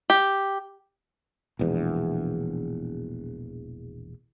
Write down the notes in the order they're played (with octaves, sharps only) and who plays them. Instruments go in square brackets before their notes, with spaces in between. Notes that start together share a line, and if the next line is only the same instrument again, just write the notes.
[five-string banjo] G4
[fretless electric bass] E1 A#1 E2